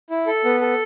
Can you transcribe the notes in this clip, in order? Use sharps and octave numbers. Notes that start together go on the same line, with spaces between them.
E4
A4
B3
A4